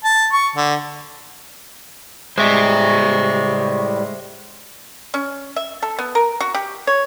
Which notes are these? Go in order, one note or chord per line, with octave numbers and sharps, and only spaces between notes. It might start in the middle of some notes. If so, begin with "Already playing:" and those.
A5
C#6
D3
A2 G3 G#3 C5 E5 C#6
C#4
E5
A4
B3
A#4
F#4
G4
C#5